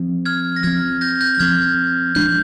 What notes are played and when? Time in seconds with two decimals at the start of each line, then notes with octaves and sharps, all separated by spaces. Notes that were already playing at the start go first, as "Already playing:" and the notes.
Already playing: F3 C4
0.25 F6 G#6
0.56 A#6
0.63 F3 F6 G#6
0.67 C4
1.01 G6 A#6
1.21 G6 A#6
1.35 G6
1.39 F3 C4 F6 G#6
2.15 F3 G#3 D4 G6